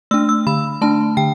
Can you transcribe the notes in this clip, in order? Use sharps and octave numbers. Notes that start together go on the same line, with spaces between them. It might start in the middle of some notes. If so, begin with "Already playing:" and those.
A3 D4 E6
E6
D3 B5
A3 D4 A5
D3 G5